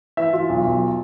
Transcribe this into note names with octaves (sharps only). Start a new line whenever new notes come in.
E3 E5
E3 F4
B1
B1